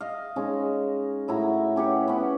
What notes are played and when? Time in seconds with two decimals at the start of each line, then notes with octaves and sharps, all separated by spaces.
0.01 D#5 F5
0.36 G#3 C#4 D#4
1.28 A2 E4 F#4 A#5
1.76 C#4 G4 B4 F#5
2.08 B3 C#4